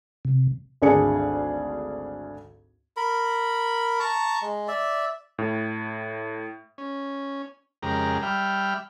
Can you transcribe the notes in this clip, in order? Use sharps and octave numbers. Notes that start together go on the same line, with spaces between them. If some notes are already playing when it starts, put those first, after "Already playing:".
C3
G#1 D2 D4 G#4 C#7
A#4 B5
A5 A#5 C#6
G#3
D5 E5
A2
C#4
F2 C#3 G#3 G4 A#4 A#5
G3 E5 G5 B5 F6